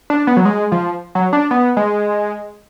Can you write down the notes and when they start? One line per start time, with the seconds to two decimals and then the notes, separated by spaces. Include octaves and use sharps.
0.10 D4
0.27 B3
0.37 F#3
0.45 G#3
0.72 F3
1.15 F#3
1.33 D4
1.51 B3
1.77 G#3